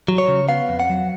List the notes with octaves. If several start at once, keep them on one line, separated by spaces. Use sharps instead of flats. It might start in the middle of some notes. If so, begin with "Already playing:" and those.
F#3
C#5
C#3
B3 F5
F2
F#5
F#3